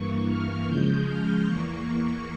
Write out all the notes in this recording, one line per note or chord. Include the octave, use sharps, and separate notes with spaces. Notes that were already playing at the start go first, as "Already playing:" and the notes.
Already playing: G2 E3 A#3 C#6
F6
C#3 F3 G#3 G6
F6
E2 E3 A#3 C#6